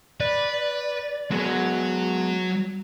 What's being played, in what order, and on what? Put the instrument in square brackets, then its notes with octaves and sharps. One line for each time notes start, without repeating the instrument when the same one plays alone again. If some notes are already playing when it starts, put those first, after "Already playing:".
[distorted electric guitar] B4 [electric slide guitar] D5
[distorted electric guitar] F#3 [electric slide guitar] G#3 B3 G#4